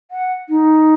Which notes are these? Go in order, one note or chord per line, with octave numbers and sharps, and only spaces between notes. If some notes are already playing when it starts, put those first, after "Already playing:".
F#5
D#4